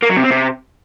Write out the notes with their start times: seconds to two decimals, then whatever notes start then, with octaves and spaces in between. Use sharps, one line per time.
0.03 A#3
0.10 F#3
0.17 C3
0.24 C4
0.31 C3